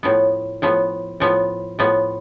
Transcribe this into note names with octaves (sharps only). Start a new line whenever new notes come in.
A2 F3 B3
A2 F3 B3
A2 F3 B3
A2 F3 B3